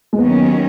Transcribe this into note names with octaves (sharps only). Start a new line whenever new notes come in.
G#3
D#2 D#3 F#3 B3 C#4